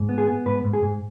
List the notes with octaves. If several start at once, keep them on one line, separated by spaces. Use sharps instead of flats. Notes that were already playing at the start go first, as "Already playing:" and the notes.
Already playing: G#2
B3
G#4
B3
G#2 B4
G#2
G#4
G#2